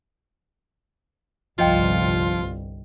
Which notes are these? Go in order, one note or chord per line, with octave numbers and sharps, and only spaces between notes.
G1 C2 F3 F4 D#5 G5